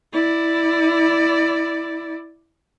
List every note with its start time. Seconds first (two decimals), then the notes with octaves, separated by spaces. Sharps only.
0.13 E4 D5